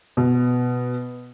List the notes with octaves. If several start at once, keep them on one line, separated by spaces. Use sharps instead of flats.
B2